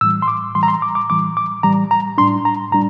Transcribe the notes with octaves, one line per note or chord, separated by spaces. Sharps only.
A2 E3 G3 E6
C6
D6
A2 E3 G3 C6
A#5
C6
D6
D6
A2 E3 G3 D6
D6
A2 E3 G3 A#5
A#5
A2 G3 D4 C6
A#5
A2 G3 D4 A#5